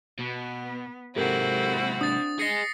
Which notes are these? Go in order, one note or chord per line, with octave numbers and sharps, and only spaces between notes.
B2 B3
G#2 C3 C4 E4 F#4 G4 A4 A#4
D4 D#6 A6
G#4 D#5 A#6 C7 C#7